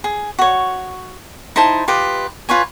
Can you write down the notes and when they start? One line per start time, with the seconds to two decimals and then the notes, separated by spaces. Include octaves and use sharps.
0.04 G#4
0.39 F#4 C#5
1.56 D#4 E4 C5 A5
1.88 F4 G4 B4 D#5
2.49 F4 B4 C#5 G#5